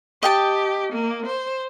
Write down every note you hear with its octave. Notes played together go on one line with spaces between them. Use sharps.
G4 D#5 G5 A5
A#3
C5